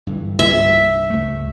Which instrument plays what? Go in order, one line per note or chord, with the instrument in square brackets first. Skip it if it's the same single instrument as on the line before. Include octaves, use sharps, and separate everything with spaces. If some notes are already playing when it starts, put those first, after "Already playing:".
[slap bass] G2 D3 E3
[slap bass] C2 G2 [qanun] E5
[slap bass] C#2 A3